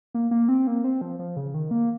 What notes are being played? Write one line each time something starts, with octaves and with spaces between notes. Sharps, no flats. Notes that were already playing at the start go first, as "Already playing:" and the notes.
A#3
A#3
C4
A#3
C4
F3
F3
C#3
D#3
A#3